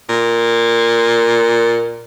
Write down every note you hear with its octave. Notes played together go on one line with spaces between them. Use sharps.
A#2